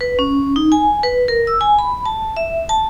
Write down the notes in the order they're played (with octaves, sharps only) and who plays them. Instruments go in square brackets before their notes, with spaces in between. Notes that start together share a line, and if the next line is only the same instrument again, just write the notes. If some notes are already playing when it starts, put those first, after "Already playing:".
[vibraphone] B4
C#4
D#4
G#5
B4
A#4
E6
G#5
B5
A5
E5
A5